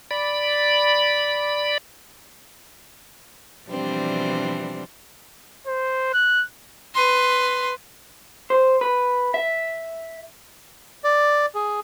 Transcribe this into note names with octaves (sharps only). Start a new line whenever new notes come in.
D5 B5
B2 E3 F3 G3 C4 D4
C5
F#6
B4 C6
C5
B4
E5
D5
G#4